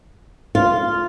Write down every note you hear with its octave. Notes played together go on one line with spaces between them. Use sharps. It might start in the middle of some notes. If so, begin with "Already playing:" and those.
F4